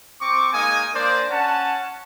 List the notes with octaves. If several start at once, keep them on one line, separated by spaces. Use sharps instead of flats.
C4 C#6 D6
G#3 A#3 D#4 G#5 D#6
A#3 D4 C5 D5
C#4 F#5 A5